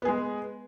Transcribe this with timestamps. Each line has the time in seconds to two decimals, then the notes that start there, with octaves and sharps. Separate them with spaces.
0.02 B3
0.05 G#4
0.08 G#3